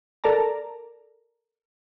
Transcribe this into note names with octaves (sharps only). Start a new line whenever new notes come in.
A4 A#4 D5 A5 A#5